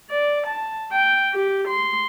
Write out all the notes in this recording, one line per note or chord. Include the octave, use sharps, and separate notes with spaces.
D5
A5
G5
G4
C6